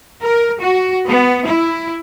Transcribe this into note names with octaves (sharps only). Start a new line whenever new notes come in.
A#4
F#4
B3
E4